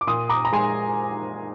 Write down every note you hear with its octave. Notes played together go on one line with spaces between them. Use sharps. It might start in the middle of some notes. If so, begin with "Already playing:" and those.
D6
A#2 C6 D#6
A#5 D6
A#5
G#3 G#5 C6